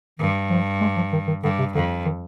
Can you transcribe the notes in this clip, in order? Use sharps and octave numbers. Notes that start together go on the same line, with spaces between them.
G2 D#3
F3
G#3
F3
D#3
D#3
G2 D3
C3
F2 D3
D#3